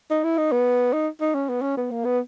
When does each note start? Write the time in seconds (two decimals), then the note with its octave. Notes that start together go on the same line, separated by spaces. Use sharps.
0.10 D#4
0.24 E4
0.38 D#4
0.52 B3
0.93 D#4
1.21 D#4
1.35 C#4
1.49 B3
1.62 C#4
1.77 B3
1.91 A#3
2.05 B3